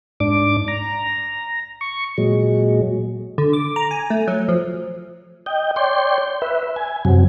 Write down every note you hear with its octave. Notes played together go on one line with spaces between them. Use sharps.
G#2 D4 D6
A#5
C#6
A#2 F#3 G#3
D3
D6
A#5
G#5
A3
F#3
F3
D#5 G5
C#5 D5 G5 C6
B4 E5
G#5
F#2 C3 F#3